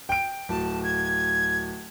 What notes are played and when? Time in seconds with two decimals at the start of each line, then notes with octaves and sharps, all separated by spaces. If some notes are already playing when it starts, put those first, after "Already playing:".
0.09 G5 D7
0.49 D1 A5
0.84 G#6